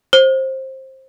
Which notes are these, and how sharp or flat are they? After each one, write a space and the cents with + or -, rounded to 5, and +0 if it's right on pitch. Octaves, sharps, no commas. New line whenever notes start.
C5 +20